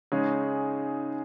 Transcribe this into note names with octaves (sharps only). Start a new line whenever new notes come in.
C#3 G#3 D#4 G#4 C#5